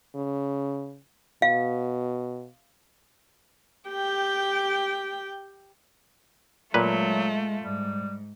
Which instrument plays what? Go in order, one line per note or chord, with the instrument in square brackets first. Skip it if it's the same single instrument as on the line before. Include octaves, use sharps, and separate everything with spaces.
[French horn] C#3
[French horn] B2 [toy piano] F5
[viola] G4 G5
[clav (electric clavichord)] A#2 B4 [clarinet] F#3 [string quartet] G#3 A3 F4
[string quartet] G#2 [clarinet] G3